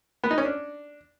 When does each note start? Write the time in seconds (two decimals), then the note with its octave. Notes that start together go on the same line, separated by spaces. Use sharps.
0.24 B3
0.31 D#4
0.38 C#4
0.45 D4